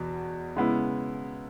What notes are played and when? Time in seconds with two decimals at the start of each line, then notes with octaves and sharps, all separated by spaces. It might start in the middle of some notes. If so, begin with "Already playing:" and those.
Already playing: E2 B2
0.56 C#3 G#3 B3 E4